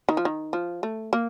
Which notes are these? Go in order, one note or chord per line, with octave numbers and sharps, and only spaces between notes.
D#3
F3
D#3
F3
A3
A#3